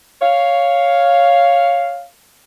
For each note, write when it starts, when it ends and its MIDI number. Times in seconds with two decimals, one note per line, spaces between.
0.22 2.05 73
0.22 2.05 77